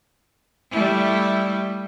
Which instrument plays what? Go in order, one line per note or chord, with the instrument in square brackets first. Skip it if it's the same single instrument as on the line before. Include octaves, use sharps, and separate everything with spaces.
[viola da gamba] G3 A3 E4